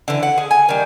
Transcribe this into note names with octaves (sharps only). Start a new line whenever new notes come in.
D3 E3
F#5
G#4
G#5
D#3 G3